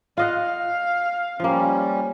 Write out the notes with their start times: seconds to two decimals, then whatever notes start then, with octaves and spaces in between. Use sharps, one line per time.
0.17 F4 D#5 F5 F#5
1.40 F3 G3 A#3 C#4